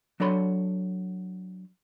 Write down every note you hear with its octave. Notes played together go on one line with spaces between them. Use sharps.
F#3 D4 A4 C#5 B5 C6